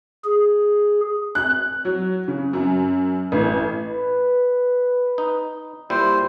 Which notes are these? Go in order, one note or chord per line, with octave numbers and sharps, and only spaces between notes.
G#4
F#6
F#3
C#3
F#2
A1
B4
D#4
A#2 G3 E4 C5